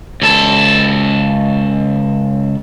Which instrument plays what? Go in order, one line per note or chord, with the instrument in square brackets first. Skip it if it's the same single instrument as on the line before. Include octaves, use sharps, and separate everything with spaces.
[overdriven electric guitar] C#2 A4